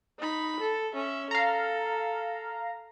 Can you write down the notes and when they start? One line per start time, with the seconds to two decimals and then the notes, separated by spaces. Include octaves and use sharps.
0.19 D#4 B5
0.60 A4
0.94 C#4 E5
1.31 A4 F5 A#5